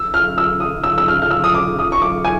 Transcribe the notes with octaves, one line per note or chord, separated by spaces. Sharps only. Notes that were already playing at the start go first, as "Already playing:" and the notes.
Already playing: E6
F6
E6
D#6
E6
E6
F6
F6
E6
D#6
D6
D#6
C#6
D6
G#5